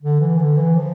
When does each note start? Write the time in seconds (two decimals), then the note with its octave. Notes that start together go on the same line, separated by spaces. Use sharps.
0.02 D3
0.20 E3
0.39 D3
0.57 E3
0.75 F3